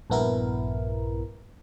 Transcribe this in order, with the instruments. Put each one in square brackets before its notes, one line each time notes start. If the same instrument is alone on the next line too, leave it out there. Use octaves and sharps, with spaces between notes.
[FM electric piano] A#1 G2 B3 E4 A#4